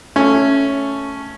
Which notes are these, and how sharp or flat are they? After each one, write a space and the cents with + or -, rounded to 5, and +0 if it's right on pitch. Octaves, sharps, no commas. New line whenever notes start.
A3 +0 C#4 +0